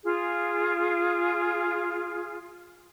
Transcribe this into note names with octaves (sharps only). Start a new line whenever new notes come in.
F4 G#4